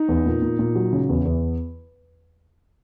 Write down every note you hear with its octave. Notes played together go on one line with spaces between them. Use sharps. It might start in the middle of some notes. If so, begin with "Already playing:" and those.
Already playing: D#4
E2
A#2
A#2
A#2
F#3
C#3
E2
E2